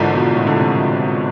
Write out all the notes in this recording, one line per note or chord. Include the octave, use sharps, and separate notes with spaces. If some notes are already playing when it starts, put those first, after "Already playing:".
Already playing: G#1 G#2 D3 E3 F3
B2
A2
D3
C3